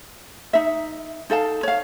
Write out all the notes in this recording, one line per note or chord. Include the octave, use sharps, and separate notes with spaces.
D#4 E5
D#4 A4 F5 A5
C#5 F5